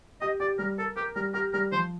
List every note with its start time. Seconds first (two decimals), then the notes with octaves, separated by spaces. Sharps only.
0.21 G4 D#5
0.40 G4 D5
0.59 G3 A#4
0.78 A4 A#4
0.96 G4 A#4
1.16 G3 A#4
1.34 G4 A#4
1.53 G3 A#4
1.72 F3 C5